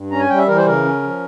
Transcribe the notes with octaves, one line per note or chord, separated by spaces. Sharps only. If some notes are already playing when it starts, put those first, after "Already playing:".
Already playing: G2
C#4 A#5
G#5
G3 G5
E5
E3 A#4
C5
C#3 A#4
C#4
F3